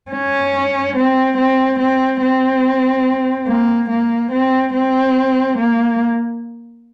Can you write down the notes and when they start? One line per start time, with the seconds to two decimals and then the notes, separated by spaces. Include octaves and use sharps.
0.12 C#4
0.96 C4
1.37 C4
1.79 C4
2.21 C4
3.47 A#3
3.89 A#3
4.32 C4
4.74 C4
5.58 A#3